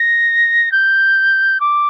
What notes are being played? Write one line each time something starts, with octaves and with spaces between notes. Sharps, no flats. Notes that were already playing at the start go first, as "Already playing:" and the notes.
Already playing: A#6
G6
D6